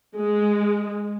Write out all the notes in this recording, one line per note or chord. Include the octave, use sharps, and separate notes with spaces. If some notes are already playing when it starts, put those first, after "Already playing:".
G#3